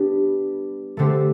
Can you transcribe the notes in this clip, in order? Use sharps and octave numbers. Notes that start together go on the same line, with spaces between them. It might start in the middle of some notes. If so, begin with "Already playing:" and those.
Already playing: G3 B3 D4 G4 B4
D3 A3 C4 G4 C5